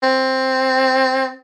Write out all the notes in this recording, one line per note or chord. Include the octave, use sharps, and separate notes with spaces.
C4